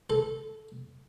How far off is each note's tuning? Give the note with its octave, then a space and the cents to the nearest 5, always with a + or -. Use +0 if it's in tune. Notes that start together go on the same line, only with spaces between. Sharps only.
A4 -15